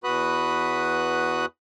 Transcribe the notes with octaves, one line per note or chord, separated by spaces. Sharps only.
E2 F#4 B4 B5 D#6 F#6